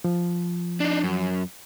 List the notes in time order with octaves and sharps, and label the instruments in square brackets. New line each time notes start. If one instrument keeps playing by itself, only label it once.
[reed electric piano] F3
[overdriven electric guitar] D4 D#4
F#2